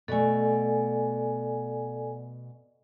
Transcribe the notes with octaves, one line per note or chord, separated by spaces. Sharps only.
B2 A3 A4 D5 G#5